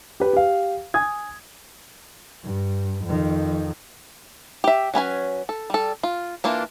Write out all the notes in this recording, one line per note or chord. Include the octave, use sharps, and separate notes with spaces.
G4 B4
G4 F5
G#5 D#6 G#6
G2
F2 D#3
G4 E5
F#3 C#4 B4 G#5
A4
G3 A4
F4
E3 A#3 D4 F4